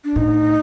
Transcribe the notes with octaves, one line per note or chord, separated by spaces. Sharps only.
D4
A2 D#4